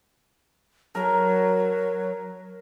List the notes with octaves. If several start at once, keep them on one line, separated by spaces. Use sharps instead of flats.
F#3 A#4